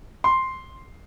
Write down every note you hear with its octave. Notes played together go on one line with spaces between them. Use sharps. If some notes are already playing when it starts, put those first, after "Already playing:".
C6